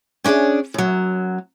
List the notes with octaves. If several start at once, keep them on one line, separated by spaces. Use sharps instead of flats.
C#4 D4 E4 G#4 D5
F#2 F#3